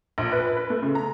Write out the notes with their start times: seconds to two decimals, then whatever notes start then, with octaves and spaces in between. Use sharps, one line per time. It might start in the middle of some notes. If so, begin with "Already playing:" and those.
0.18 A#1
0.32 B4
0.57 B4
0.70 A3
0.83 C#3
0.95 A#5